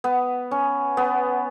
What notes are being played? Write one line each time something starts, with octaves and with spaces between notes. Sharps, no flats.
B3
C#4
B3